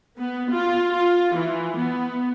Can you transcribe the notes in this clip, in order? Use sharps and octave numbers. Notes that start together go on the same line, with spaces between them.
B3
F4
F4
E3
B3